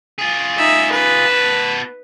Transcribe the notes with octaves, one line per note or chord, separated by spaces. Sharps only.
F4 G#4
D#4 E5
B4
B3 A5